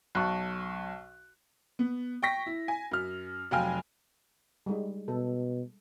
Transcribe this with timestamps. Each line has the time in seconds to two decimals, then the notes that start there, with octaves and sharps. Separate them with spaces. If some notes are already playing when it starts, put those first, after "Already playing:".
0.15 B1 A5 C#6 F#6
1.79 B3
2.22 G5 C#6 A#6 B6
2.46 E4
2.68 G#5
2.91 F#2 F6
3.51 F1 F#3 F5 G5 G#5 F6
4.66 G3 G#3 D#4
5.08 B2 A4